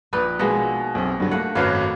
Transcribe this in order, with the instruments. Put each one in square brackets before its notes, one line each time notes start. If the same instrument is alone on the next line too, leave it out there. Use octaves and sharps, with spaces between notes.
[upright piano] A#1 [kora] D#4 B4 D5
[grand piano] B2 [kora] G#3 A#3 B3
[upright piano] B1 C4
G2 D3 F#3
[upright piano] A3 [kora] A#3 F#5
[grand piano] G#1 F#2 F#3 [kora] B4 F5